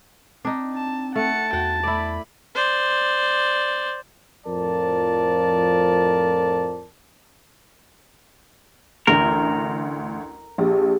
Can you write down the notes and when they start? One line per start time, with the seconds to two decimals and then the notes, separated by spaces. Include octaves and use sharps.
0.45 C4 D4 D#4
0.74 A5
1.15 A3 F#5 A5 C#7
1.53 E2 F#4 F#5 G5
1.83 A3 E4 D5 B5
2.55 C5 D5
4.46 F2 A2 F3 A#4 D5 A5
9.07 A1 D2 A#4
10.58 A#1 G4 G#4